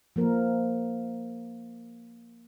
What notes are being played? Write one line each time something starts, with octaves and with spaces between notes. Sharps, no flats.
F3 A#3 A#4